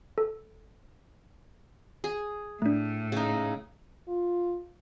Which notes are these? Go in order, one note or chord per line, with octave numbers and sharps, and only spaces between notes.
A4
G#4
A2 A3 D4
C#3 D#4
F4